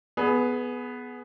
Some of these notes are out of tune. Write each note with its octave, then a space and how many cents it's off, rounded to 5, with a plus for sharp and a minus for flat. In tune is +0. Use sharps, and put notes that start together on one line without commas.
B3 +0 G#4 +20